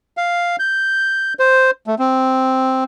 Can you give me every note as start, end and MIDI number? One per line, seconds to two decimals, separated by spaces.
0.17 0.56 77
0.59 1.34 91
1.39 1.71 72
1.87 1.95 57
1.99 2.84 60